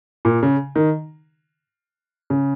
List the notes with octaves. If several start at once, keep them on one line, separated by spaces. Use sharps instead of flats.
A#2
C#3
D#3
C#3